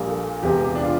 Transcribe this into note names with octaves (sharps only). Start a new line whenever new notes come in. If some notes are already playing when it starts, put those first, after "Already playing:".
Already playing: A#1 A#2 G3 A#3
A4
E1 E2 C3 G4
D4
F4